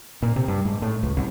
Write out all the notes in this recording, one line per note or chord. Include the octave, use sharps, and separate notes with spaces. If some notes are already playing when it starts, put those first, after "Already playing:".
A#2
C3
G2
G#2
A2
C#2
C2